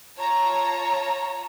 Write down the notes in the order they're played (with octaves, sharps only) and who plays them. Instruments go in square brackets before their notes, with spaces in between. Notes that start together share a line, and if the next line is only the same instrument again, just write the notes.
[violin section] F4 C#5 A5 A#5